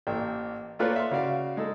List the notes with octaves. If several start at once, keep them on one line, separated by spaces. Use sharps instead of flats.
A1 A#3 A4 G5
A3 A#3 F4 B4 C#5 D5
E5 F5 C6
C#3 F#4 D5 F5
G#3 D#4 A4